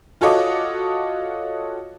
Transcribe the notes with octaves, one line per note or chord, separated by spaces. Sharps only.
F4 F#4 A4 C#5 D#5 D6